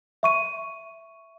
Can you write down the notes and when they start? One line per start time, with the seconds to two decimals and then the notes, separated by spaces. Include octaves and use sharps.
0.23 E5 C#6 D#7